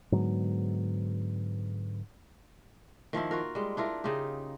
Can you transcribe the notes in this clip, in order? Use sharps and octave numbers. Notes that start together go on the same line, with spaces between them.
G#2 D3 F#3 B3
D#3 F3 A#3 E4
F4 F#4 A#4
G3 G#3
D4 E4 F4 A#4
C#3 D#4 F4 G4